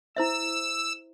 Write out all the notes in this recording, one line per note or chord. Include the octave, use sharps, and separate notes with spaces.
E4 C5 E5 E6